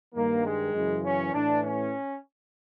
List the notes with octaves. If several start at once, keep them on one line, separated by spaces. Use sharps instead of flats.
G2 D#3 A#3
G#3
F#2 C#3 E3
C#4
A2 E3 D4
C#4